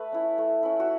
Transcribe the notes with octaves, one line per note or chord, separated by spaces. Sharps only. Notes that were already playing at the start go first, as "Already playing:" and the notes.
Already playing: A3 B4
C#4 E4
A3
C#4 E4
F#4